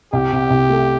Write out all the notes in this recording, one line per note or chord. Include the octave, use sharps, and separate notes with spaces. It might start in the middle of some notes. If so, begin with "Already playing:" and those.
C2 G4
C3
C2
A3